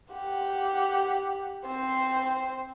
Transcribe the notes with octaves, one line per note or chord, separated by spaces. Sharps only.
G4 F#5
C4 C5